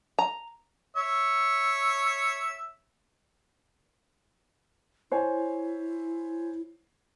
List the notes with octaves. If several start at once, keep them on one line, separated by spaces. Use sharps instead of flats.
A#5
C#5 E5
E4 C5 C#5 G#5